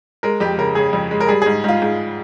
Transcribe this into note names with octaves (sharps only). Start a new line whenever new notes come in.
G#3 A#4
F2 G4
C#3 A#4
C#3 G#4
F2
G#3
A#4
G3 G#4
G#4
G#2
G#2 F4
G#2